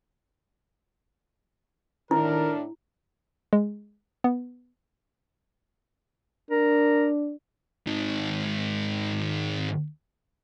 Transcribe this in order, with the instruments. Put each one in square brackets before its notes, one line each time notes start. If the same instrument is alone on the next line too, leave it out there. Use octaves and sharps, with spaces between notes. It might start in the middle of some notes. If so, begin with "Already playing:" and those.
[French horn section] A2 D4 [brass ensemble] D#3 A#4 [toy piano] E4
[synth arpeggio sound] G#3
B3
[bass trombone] D4 [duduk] A#4
[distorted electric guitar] G#2 D#3